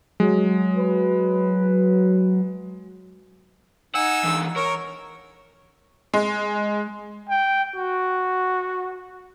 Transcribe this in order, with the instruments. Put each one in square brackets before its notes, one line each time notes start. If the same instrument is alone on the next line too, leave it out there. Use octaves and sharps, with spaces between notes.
[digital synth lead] F#3 [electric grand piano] G#3
[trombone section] B4
[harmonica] D#4 G#5 E6 [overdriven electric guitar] F#5
[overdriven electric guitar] E3 D4
[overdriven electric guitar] A#4 [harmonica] C#5
[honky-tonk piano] G#3
[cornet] G5
F#4